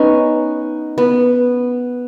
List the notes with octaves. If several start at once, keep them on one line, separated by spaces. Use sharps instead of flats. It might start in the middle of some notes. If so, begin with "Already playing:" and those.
Already playing: B3 C#4 D#4
B3